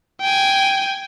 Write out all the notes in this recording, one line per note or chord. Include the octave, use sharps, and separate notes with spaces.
G5 G#5